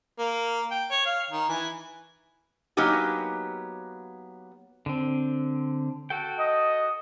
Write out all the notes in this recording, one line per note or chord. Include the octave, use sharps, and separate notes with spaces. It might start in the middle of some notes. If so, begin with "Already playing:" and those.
A#3
G5
C#5
F5
D#3
E3 G#5
F#3 A#3 B3 D#4 G4 G#5
D3 C4
F#4 A4 G5
D#5